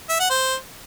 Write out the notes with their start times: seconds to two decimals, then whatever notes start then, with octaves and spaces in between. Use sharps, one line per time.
0.09 E5
0.20 F#5
0.30 C5